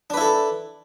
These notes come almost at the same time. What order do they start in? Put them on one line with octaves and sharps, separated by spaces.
D4 B4 E4 A4